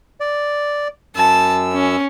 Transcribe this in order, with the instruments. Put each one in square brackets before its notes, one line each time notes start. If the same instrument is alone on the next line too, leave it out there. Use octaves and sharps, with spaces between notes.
[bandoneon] D5
[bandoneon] F#2 E6 [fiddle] A5
[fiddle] C#4